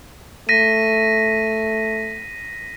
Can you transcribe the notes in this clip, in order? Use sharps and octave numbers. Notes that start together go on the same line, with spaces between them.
A3 A#6 B6 D#7